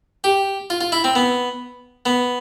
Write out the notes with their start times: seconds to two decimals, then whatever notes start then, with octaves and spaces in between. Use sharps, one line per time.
0.24 G4
0.70 F4
0.81 F4
0.92 E4
1.04 C4
1.15 B3
2.06 B3